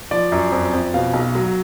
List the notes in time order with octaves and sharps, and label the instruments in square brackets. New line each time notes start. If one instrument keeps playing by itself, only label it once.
[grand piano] F3 D5
F#2
F2
F2
B2 F5
B1
F#3